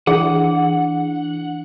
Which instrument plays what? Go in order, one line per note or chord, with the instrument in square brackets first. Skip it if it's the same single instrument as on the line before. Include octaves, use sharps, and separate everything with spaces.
[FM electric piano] E3 [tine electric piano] D4 [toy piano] G#4 [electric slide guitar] F#5